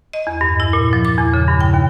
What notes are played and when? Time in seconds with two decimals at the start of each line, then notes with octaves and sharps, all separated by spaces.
0.13 D#5
0.27 E2
0.41 G2
0.60 E4
0.73 A#2
0.93 F3
1.05 D6
1.18 E2
1.34 C#3
1.48 G2
1.61 G5
1.74 D#2